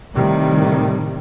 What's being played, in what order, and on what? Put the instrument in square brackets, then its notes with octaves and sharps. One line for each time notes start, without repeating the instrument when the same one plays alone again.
[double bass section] A2 C3 D#3 G3